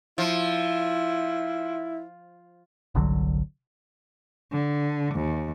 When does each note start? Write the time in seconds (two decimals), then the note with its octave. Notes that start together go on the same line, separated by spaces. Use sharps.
0.18 F3 E4
2.95 G1 C2 D3 F#3
4.52 D3
5.15 D#2